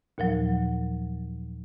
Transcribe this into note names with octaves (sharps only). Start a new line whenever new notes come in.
D#2 A#2 F3 F#3